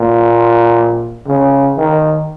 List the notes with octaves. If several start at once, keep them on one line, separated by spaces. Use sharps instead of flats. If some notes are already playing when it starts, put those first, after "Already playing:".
Already playing: A#2
C#3
D#3